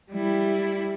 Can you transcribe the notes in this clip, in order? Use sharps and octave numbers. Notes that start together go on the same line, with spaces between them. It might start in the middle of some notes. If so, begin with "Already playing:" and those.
G3 E4